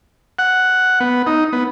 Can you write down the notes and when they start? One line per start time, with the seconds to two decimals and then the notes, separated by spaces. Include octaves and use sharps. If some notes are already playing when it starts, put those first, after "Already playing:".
0.39 F#5
1.00 B3
1.27 D#4
1.53 B3